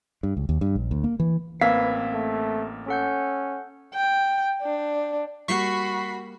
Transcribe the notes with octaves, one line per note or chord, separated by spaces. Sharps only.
G2
C#2
D#2
G2
A#1
D2
A#3
E3
A1 A#3 C4 B4 F5 E6 G#6 B6
A3
C#4 A4 F#5 G6
G5
D4
G3 A#3 F#4 B5 C#6 B6 C7